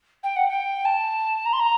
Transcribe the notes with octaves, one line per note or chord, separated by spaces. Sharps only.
G5
F#5
G5
A5
A#5
C6
A#5